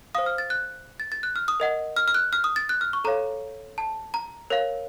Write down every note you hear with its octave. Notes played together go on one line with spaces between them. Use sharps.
C5 F5 D#6
F6
A6
F#6
A6
A6
F#6
F6
D#6
A#4 D#5 F#5
F6
F6
F#6
F6
D#6
A6
F#6
F6
C#6
A4 C#5 F5 A#5
A5
A#5
A#4 C#5 F5